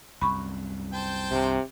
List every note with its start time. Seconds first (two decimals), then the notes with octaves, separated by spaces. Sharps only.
0.21 C2 F#2 B5 C#6
0.93 C5 G5 A5
1.31 C2 G2 C3